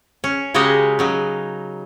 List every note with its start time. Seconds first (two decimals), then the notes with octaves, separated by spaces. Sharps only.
0.24 C#4
0.54 C#3 G#3 F#4 G4 A#4 D#5
0.99 C#3 F#3 D#4